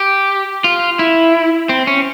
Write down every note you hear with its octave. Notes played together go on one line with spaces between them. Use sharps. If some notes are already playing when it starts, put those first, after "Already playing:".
Already playing: G4
F4
E4
C4
C#4